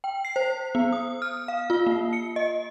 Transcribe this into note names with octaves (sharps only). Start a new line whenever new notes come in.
G5
C7
C5
B3
D#6
F6
F5
F4
A#3
C#7
D#5